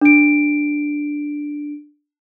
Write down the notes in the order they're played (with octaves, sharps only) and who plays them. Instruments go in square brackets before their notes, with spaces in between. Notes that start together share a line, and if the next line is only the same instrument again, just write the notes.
[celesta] D4 D7